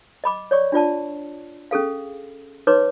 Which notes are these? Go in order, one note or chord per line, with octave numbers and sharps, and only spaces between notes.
D#5 B5 D6
C#5 D5 C#6
D4 F4 D5 A5
C#4 G#4 A4 F5
D#4 B4 C#5 C6 D6